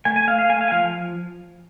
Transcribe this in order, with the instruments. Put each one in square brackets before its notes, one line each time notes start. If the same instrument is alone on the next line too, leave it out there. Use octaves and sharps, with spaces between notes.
[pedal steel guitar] A3 G#5
G#5
A3 F5
F5
A3 G#5
F5
G#5
F3 F5